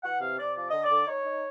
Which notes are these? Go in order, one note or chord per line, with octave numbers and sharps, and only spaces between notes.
E3 F#5
C3 F5
C3 D5
F3 D5
D3 D#5
D5
D3
D#4 C#5
D#4